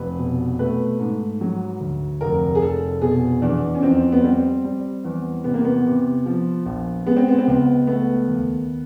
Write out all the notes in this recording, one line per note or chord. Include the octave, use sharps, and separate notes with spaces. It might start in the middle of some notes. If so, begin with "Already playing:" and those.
Already playing: F1 B4
B2
A3 B4
G#2
F#3
D2
F1 A#4
G#4
F1 A4
B2 G#4
E2 D4
C#4
F2 C4
B3
G3 C4
G3
E2
C3 B3
A#3
B3
C3
F3
A#1
G#3 B3
C4
B3
C4
C#2 B3
A3 B3
D#2